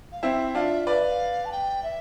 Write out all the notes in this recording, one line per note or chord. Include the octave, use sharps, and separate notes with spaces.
F5
C4 E4 E5
D4 F4
B4 D5 F5
E5
F5
A5
G5
E5